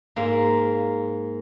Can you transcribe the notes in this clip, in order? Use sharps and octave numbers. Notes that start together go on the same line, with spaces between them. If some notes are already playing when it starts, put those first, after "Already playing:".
G#2 A#3